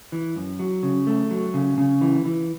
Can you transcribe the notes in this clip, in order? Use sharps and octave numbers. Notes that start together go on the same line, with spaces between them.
E3
F#2
F#3
C#3
A3
F#3
C#3
C#3
E3
E3